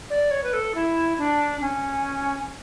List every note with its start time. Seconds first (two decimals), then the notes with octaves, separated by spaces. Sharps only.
0.10 D5
0.31 C#5
0.44 B4
0.53 A4
0.75 E4
1.18 D4
1.61 C#4